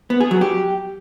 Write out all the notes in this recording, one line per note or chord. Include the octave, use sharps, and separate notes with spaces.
B3
G#4
F#3
G4